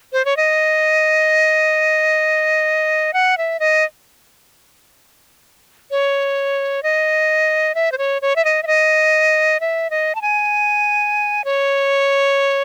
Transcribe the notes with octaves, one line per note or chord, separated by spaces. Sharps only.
C5
C#5
D#5
F#5
E5
D#5
C#5
D#5
E5
C5
C#5
C#5
E5
D#5
E5
D#5
E5
D#5
A5
G#5
C#5